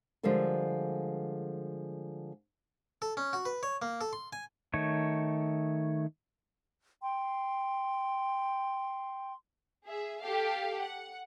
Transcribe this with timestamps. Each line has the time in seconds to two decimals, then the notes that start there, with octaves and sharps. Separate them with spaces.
0.23 D3 F3 G3 G#3 A4 A#4
3.02 A4
3.17 C#4
3.33 F#4
3.45 B4
3.63 C#5
3.82 A#3
4.01 A4
4.13 C6
4.33 G#5
4.74 D#3 A3 C#5
7.01 G5 C6
9.87 G#4 E5
10.20 G4 A4 F5
10.80 F#5